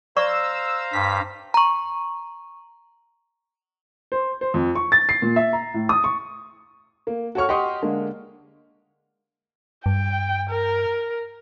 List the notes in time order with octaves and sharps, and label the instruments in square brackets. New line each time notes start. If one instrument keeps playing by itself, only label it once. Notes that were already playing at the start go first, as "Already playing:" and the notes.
[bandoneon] C5 F5 A#5 [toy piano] D5 C#6 [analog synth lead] E6
[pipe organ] G2 [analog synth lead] B6
[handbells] A#5 C#6
[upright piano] C5
C5
F2
C#6
A6
C7
A#2
E5
A#5
A2
D#6
C#6
A#3
F#4 A4 C#5 C#6 F6
G4 D#5 F#5 C6 C#6 D#6
D3 G#3 A#3 D4
[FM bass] G2 [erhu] G5
[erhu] A#4